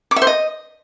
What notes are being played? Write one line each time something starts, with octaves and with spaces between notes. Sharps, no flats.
D6
E5
C5
D#5